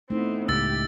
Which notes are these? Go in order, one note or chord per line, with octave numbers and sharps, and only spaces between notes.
A3 B3 C4 D#4 E4
C#2 A2 G4 E6 A6